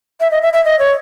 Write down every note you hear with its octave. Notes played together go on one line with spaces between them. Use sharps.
E5
D#5
E5
E5
D#5
C#5